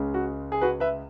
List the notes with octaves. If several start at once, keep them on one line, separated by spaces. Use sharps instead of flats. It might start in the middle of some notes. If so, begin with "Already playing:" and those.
Already playing: C#2 C#3 G#3
F#4
G#4
F#4 B4
B4 E5